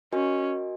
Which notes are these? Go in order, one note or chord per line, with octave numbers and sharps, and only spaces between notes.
C#4 F#4 A#4 D#5 G#5